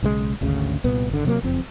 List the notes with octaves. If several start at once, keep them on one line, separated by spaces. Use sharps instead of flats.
B1 C#3 E3 G#3
G#1 D2 C#3
C2 A#2 B3
G#1 D3
C3 F#3 A3 A#3
F#1 F2 C4